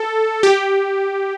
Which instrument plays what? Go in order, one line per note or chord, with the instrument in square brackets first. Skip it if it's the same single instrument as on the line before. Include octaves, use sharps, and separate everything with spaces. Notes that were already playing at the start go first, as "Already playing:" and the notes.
Already playing: [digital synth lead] A4
G4